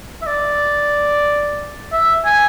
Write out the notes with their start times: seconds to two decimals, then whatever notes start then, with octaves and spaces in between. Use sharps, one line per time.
0.22 E5
0.27 D5
1.92 E5
2.25 G#5